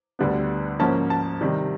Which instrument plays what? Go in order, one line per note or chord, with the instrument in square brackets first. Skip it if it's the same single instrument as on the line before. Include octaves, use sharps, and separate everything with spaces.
[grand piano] D2 D3 G3 B3
G#2 F3 A#3 C#4 A5
A5
C3 D#3 G3